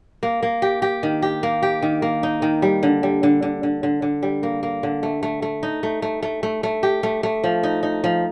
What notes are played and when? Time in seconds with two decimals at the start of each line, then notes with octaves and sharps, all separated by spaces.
0.23 A#3
0.43 A#3
0.62 G4
0.82 G4
1.03 D#3
1.22 G4
1.43 A#3
1.63 G4
1.82 D#3
2.02 A#3
2.23 D#4
2.42 D#3
2.62 G3
2.83 D3
3.03 G3
3.23 D3
3.42 D3
3.63 D3
3.83 D3
4.02 D3
4.23 G3
4.43 A#3
4.63 A#3
4.83 D3
5.03 A3
5.23 A3
5.42 A3
5.63 D#4
5.83 A3
6.02 A3
6.22 A3
6.43 A3
6.63 A3
6.83 G4
7.03 A3
7.23 A3
7.44 F3
7.63 D#4
7.83 D#4
8.04 F3